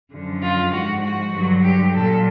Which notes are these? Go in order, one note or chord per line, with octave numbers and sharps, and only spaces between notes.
F#2 D3 F3
F4
G#2 F3 F#4
F#4
G2 D3 F#3
G4
A#2 F#3 A4